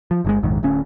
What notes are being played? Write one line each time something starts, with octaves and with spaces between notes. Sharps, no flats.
F3
G1 E3 G#3
A#1 F2 G#2 D#3
D1 D2 C#4